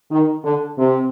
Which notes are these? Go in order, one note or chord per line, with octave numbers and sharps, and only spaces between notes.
D#3
D3
C3